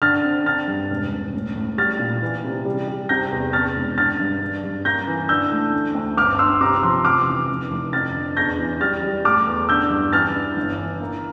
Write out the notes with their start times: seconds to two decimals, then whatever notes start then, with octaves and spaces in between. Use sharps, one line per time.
0.02 D3 F6 A6
0.25 C4
0.46 D3 F6 A6
0.68 G2
0.90 E1
1.12 E1
1.34 A2
1.56 A2
1.78 G3 F6 A6
1.99 A#2
2.22 E3
2.44 C3
2.65 G3
2.88 G3
3.09 C3 G6 A#6
3.31 E2
3.53 E2 F6 A6
3.76 E1
3.98 D3 F6 A6
4.20 G2
4.42 D4
4.63 G2
4.85 A#3 G6 A#6
5.07 E3
5.29 D3 E6 G6
5.51 A3
5.73 D2
5.95 D2
6.17 G1 D6 F6
6.39 G1 C6 E6
6.61 C3 A#5 D6
6.83 F3 C6 E6
7.05 F1 D6 F6
7.27 E3
7.49 F1
7.70 F1
7.93 F2 F6 A6
8.16 D3
8.37 E2 G6 A#6
8.59 E3
8.80 G3 F6 A6
9.03 G3
9.25 A3 D6 F6
9.47 E2
9.69 D3 E6 G6
9.90 G2
10.12 E3 F6 A6
10.35 D4
10.57 G1
10.78 E3
11.01 A#3